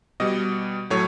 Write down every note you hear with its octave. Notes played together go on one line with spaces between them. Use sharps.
B2 G3 D#5
A2 F#3 A3 C#5